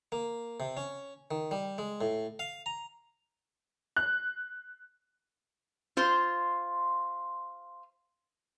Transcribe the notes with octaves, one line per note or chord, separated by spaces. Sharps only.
A#3
C3
C#4
D#3
G3
G#3
A2
F5
A#5
F#6
F4 C5